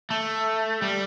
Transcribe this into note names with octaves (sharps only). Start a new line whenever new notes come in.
A3
G3